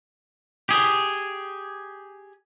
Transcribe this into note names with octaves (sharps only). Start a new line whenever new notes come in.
G4 G#4